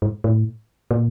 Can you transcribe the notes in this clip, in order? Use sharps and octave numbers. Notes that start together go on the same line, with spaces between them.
G#2
A2
A#2